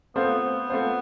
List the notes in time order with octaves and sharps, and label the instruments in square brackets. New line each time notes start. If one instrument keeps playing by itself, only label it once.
[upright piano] A3 C4 F4 C5 [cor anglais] B3
[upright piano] A3 C4 F4 C5